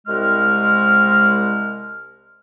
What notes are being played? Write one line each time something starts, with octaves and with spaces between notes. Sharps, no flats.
C2 G#3 F6